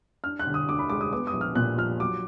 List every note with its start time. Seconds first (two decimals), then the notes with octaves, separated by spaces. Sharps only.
0.24 D4 F6
0.39 F#6
0.46 D3
0.54 D#6
0.68 D2 D6
0.79 B5
0.89 G#3 D6
1.01 D#6
1.13 B3 D6
1.27 D#6
1.33 A#1
1.41 F6
1.55 A#2 F#6
1.77 F3 F6
2.00 F#3 D6